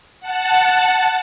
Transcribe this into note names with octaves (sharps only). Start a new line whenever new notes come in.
F#5 A5